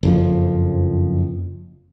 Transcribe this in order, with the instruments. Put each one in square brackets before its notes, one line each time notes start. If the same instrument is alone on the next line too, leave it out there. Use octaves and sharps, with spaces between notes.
[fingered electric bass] F#1 F2 F3